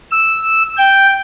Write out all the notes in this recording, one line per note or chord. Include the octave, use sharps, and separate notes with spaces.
E6
G5